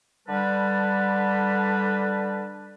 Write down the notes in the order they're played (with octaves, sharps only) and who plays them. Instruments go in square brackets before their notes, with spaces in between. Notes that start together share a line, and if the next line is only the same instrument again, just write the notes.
[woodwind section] D3 G3 B4 A5